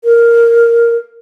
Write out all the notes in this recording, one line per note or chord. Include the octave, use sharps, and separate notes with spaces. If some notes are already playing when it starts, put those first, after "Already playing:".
A#4